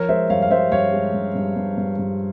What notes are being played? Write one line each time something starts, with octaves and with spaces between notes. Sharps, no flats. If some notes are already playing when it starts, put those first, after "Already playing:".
Already playing: F3 A#4 C#5
G#3 C5 E5
G2 C#5 F5
F5
G2 C5 E5
G2 C#5 F5
G#3
G2
G2
G2
G2
G2